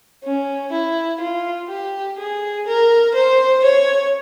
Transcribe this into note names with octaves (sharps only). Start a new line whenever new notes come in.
C#4
E4
F4
G4
G#4
A#4
C5
C#5